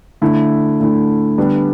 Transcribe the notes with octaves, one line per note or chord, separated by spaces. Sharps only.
D3 A3 E4
D3 A3 E4
D3 G3 B3 D4